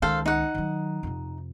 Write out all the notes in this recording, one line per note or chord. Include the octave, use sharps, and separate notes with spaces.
C#2 D#3 A4 C5 F5
D#4 F#5
D#3 F#3
F2 C3